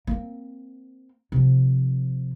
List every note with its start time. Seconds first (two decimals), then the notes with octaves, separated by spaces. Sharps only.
0.07 A#3 C4
1.32 C3 F3